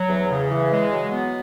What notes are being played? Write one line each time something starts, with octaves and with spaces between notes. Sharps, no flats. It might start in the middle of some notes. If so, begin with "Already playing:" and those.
Already playing: F#3
E2
C#3
E3
G#3
F#3
B3